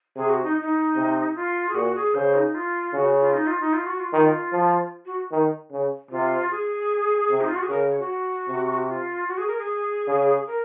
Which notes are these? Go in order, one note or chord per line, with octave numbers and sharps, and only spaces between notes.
C3 G#4
F#4
D#4
D#4
C3
F4
G#4
A#2 F#4
G#4
C#3 C5
D#4
F4
C#3 F#4
F4
D#4
F4
D#4
F4
F#4
F4
D#3
F3
F#4
D#3
C#3
C3 F4
G#4
C3
D#4
F4
F#4
G#4
C#3 A#4
C#5
F#4
C3
F4
F#4
G#4
A#4
G#4
C#3
A#4